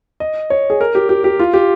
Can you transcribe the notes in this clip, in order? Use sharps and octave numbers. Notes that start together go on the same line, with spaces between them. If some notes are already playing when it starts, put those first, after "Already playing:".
D#5
C#5
G#4
A#4
G4
G4
G4
F4
G4